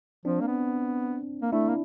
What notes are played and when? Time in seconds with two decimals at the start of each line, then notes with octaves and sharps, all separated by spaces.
0.25 F3 C4 D4
0.41 A#3
0.47 B3
1.42 A#3
1.52 A3 D4 E4
1.69 A#3